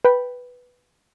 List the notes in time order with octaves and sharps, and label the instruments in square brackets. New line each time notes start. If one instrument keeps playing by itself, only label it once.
[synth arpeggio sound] B4 G5 B5